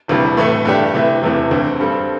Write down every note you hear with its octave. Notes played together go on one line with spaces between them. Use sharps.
E1 D2 C3 E3 G3
A2 E3 A3
G2 D3 A3 D4 G4
C3 E3 A3 E4
E1 E2 C3 E3 A3
D2 D3 C4
G2 G3 C4 A4